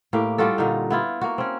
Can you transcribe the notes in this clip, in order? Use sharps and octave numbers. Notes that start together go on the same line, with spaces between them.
A2 A#3 G4
G3 F4 F#4 A4
A#2 D3 D#4
B3 E4 F4
A#3 F#4
C4 C#4